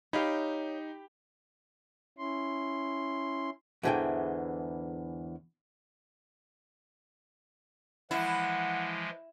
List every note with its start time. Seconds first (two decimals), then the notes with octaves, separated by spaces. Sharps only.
0.13 D#4 G4 C#5 F5 G5 B5
2.18 C#4 E4 C6
3.83 E2 G#2 D3 E3 G#4 G5
8.11 E3 F3 G#3 E4 F#5